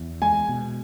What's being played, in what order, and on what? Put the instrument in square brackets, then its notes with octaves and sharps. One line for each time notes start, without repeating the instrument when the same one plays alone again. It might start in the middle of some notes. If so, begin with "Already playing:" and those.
Already playing: [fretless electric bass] E2
[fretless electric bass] G#3 [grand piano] G#5
[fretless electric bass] B2